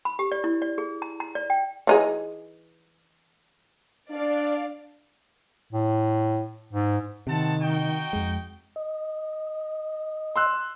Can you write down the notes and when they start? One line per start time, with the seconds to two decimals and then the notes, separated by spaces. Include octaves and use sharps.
0.05 B5
0.19 G4
0.32 D5
0.44 E4
0.62 D5
0.78 G#4
1.02 A#5
1.20 A#5
1.35 D5
1.50 G5
1.87 E3 D#4 G#4
4.11 D4 D5 F5
5.73 A2
6.73 G#2
7.27 C3 D#3 C4 F#5 A5
7.62 D#4 F#4 G5
8.13 F2 G#3
8.76 D#5
10.36 C6 E6 F#6